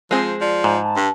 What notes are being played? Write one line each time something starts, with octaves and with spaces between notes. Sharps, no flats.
F3 G#3 C4 G#4
F3 D5
G#2
A5
G2